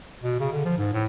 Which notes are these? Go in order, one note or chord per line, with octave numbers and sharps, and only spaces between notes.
B2
C#3
D3
F3
G#2
A2